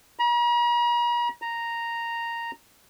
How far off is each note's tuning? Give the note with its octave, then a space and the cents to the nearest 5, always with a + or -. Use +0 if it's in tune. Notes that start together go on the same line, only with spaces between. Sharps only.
A#5 +45
A#5 -5